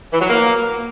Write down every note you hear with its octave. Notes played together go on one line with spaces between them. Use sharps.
E3
F#3
A#3